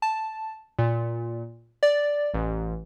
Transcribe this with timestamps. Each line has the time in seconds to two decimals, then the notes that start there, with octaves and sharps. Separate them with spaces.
0.02 A5
0.79 A#2
1.83 D5
2.34 A1